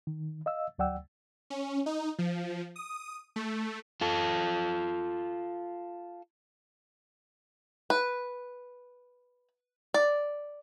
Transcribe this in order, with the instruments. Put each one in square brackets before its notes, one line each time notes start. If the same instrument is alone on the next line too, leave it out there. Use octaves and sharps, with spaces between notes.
[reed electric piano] D#3
D#5 F5 E6
D2 F#3 D5 F#5 G5 E6
[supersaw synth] C#4
D#4
F3
D#6
A3
[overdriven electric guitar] F4 A4
[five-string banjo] B4
D5